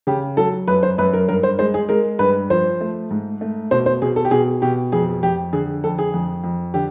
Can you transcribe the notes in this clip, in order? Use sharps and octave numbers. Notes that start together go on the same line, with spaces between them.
C#3 G4
F#3 A4
F#2 B4
C5
F#2 B4
A#4
G2 A#4
C5
G#3 C5
G#4
G#3 A#4
G2 B4
F3 C5
A3
G#2
A3
B2 C5
C5
B2 G#4
A4
G4
B2 G#4
B2 G4
F2 G#4
F2 G4
D3 G#4
F2 A4
G#4
F2
F2
D3 G4